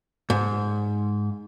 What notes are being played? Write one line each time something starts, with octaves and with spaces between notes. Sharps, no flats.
G#2